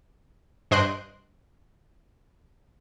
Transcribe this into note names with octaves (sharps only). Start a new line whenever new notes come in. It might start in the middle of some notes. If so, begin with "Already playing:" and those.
G2 C5 D#5 C6 F#6 D7